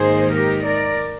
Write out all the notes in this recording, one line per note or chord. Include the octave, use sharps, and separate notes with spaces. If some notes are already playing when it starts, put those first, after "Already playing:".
Already playing: G#2 D#3 A#3 D#4 G#4 C5
G4 A#4
A#4 D5